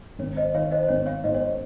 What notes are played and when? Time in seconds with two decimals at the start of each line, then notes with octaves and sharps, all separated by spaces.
0.19 G#1 C#5
0.37 C5 D#5
0.54 D#3 C#5 F5
0.71 C5 D#5
0.83 C5
0.88 G#1 C#5
1.06 C#5 F5
1.24 G#2 C5 D#5
1.34 C#5
1.41 C5